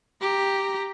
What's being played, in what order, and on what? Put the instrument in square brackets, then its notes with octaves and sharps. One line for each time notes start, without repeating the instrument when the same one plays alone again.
[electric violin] G4 A#5